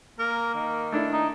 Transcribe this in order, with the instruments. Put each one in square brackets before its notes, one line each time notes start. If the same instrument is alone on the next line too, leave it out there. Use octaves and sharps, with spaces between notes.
[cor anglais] A#3 [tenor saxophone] A#4
[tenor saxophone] D#3
[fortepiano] A3 D4 E4
[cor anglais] D#4